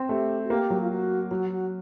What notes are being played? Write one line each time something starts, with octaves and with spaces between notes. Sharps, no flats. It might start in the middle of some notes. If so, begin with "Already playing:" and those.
Already playing: C4
A3 G4
F#4
A#3 G4
F#3
F4
F#4
F#3 F#4
F#4